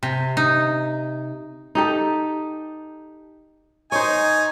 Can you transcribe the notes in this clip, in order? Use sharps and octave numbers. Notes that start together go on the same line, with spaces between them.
C3
D#4
D#4 G4 A4
D#4 C5 C#5 G#5